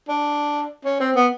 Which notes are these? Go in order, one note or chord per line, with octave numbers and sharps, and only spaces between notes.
D4
C#4
C4
B3